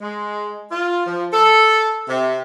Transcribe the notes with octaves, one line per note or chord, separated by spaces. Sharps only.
G#3
F4
F3
A4
C3